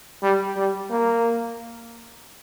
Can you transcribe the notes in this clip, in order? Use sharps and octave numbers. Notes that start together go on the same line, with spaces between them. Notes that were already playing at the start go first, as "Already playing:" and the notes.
G3
G3
A#3